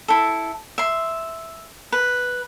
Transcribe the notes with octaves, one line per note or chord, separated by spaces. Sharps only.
E4 A4
E5 C6
B4